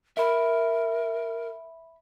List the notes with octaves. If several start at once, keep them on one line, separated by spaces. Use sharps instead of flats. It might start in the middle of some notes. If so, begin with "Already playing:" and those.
A#4 E5 B5